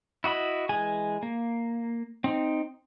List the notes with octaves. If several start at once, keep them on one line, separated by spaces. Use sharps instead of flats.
E4 F#4 D#5 B5
E3 G#3 G#4 G#5
A#3
C4 D#4